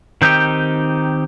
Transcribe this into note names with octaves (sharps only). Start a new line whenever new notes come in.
D#3 C4 D#4 G4